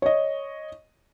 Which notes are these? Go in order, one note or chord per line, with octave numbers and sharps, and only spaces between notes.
C#5 D#5